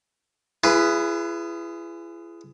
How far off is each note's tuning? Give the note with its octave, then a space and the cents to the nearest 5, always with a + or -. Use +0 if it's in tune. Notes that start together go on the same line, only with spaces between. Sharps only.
E4 +40 G#4 +0 B4 +0